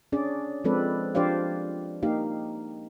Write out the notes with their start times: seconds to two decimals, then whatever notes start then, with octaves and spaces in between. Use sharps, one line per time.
0.12 C#4 D4 G#4 D5
0.64 F3 G#3 C4 A4 B4 D5
1.15 F3 D4 G4 C5 D5 F5
2.03 A#3 D#4 G4 F5